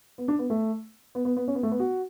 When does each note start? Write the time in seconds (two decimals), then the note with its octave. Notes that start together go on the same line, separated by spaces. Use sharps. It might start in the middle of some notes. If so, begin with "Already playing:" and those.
0.18 B3
0.28 D4
0.39 B3
0.50 A3
1.15 B3
1.25 B3
1.37 B3
1.48 C#4
1.55 B3
1.63 A3
1.71 B3
1.80 F#4